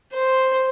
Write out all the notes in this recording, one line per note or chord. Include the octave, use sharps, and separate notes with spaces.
C5